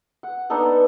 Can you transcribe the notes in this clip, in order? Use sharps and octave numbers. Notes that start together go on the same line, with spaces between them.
F#5
B3 D4 D#4 A4